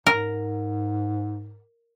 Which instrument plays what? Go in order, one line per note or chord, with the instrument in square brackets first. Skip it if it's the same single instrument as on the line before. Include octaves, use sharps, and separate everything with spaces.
[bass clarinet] G#2 [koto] A#4